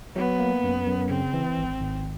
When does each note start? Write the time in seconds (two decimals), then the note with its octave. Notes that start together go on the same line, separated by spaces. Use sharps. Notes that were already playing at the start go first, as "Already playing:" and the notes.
0.16 F#3 B3
0.39 A#3
0.64 F#2
0.86 F#2
1.10 C#3 C4
1.33 E3
1.57 G#1
1.81 G#1